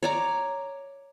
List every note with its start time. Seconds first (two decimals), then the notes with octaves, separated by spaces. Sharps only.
0.03 C#5 D5 A#5